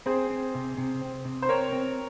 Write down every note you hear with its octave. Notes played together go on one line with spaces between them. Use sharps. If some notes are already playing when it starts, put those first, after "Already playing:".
C4 G#4 C5
C4
C3
C3
C4
C3
C5
C4 A#4 C#5
C4